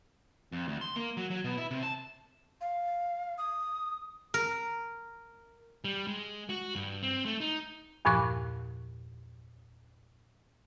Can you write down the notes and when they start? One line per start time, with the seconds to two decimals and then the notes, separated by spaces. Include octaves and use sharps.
0.52 F2
0.68 D2
0.81 C6
0.96 A#3
1.17 F#3
1.30 F#3
1.44 B2
1.57 E4
1.71 C3
1.83 A5
2.61 F5
3.38 D#6
4.34 A#4
5.85 G3
6.07 G#3
6.49 F#4
6.76 G2
7.02 C4
7.26 A3
7.40 D#4
8.05 E2 G2 A#2 F3 C#6 F#6